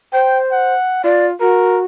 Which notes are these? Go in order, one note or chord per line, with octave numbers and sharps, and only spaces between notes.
C5 G5
F#5
F4 D5
F#4 A#4